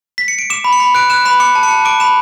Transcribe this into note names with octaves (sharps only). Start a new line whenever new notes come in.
B6
C#7
D7
D6 E7
B5
C#7
B5
F#6 D7
F#6 E7
B5 E7
D6 C#7
A5
C#7
A5
D6 D7
B5 E7